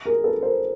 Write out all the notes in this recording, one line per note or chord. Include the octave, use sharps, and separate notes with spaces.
G#4 A#4
A4 B4
A#4 C5